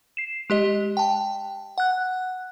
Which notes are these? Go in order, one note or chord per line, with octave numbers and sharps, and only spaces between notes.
C7 E7
G#3 G4 D#5
G5 A5
F#5 F#6